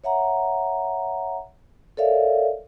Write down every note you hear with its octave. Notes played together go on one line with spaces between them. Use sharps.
C#5 E5 F#5 A#5
A4 A#4 C#5 D5 E5 F5